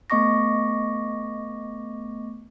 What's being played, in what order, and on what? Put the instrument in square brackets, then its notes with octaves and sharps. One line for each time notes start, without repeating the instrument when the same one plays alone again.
[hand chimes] A3 B3 D#5 C#6 D6 A#6